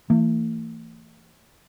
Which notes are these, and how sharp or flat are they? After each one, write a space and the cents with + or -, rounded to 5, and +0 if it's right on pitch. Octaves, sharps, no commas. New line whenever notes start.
E3 +0 A3 +45